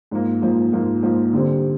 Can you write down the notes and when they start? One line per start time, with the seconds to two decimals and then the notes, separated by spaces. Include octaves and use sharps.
0.11 G#2 F3 A#3
0.42 G#2 F3 A#3
0.72 G#2 F3 A#3
1.02 G#2 F3 A#3
1.33 D3 G3 C4